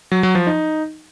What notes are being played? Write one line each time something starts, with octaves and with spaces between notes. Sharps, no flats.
F#3
F#3
F3
D#4